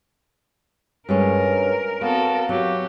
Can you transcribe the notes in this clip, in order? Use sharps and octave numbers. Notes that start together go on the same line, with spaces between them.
G2 G#3 C#4 A#4 B4 C#5
B3 C4 F#4 A4 F5
F#3 F#4 G4